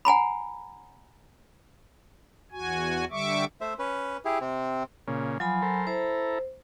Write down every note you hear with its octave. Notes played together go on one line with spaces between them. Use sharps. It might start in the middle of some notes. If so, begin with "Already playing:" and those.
F#5 G#5 A#5 B5
E2 F#4 G#5
D3 G3 E5 C#6 D6
A3 C5 E5
C#4 B4
E4 G4 G#4
C3 C4
A#2 C#3
F3 F#3 G#5 B5
A4 A#4 C5
E4 A4 C5 A#5